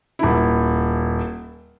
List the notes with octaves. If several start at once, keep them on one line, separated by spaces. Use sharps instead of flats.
D#1 E4